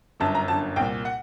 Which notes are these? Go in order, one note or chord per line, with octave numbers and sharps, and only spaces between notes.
G1 F#2 D3 A5
A#5
G1 F#2 D3 A5
C2 A#2 G5
F#5